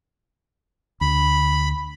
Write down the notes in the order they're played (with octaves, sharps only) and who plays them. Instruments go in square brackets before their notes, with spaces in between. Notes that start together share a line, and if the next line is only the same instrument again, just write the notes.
[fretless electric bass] D2 [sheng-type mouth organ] B5